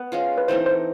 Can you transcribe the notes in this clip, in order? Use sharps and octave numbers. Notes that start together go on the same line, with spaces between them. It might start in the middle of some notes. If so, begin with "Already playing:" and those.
Already playing: B3 B4
G#3 C#4 F4
B4
E3 A3 C4 D#4 C5
C5